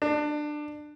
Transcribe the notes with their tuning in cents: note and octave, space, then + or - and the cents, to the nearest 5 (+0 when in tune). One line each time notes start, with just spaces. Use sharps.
D4 +20